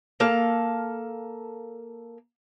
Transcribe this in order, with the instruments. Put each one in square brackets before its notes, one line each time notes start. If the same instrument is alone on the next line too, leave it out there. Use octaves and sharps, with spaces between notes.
[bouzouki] A#3 A4 F5